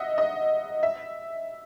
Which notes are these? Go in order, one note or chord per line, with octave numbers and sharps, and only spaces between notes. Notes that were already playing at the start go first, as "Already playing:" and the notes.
Already playing: D#5 E5 F#5
D#5
E5